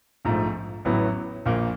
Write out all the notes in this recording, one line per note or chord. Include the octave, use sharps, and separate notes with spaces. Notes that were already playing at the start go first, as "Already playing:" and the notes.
A#1 G#2 F3 A3
A1 A2 F#3 B3 E4
A#1 A#2 F3 A#3